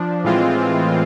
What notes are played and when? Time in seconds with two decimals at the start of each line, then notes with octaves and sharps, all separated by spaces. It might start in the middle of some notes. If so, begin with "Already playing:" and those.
Already playing: F3 D4
0.24 A2 E3 G#3 C4 F4